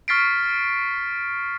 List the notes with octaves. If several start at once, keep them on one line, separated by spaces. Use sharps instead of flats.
C#6 F6 A6 B6 C7 D7